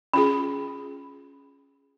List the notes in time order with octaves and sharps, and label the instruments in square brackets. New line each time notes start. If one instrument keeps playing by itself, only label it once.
[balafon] C#4 F4 G#4 [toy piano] B5